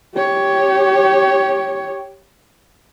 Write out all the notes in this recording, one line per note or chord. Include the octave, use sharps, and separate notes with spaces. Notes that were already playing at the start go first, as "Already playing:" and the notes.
G4 C#5